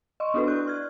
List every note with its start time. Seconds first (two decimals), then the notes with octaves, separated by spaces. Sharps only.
0.20 D#5 C6 C#6
0.34 B3 D4 E4 F#4 A4 B4
0.47 D5 C#6 F#6 G6
0.67 F6 G#6